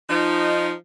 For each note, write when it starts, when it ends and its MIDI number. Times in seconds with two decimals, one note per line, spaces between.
0.09 0.72 53
0.09 0.72 63